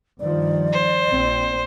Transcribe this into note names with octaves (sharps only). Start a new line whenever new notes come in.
G2 D#3 F3 D5
C5
A#1 C4